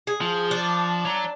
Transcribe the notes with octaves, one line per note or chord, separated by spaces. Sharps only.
G#4
F3
D4
C#5 A#5